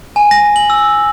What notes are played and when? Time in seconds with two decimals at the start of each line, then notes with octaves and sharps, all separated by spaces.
0.16 G#5
0.31 A#6
0.56 F#7
0.70 E6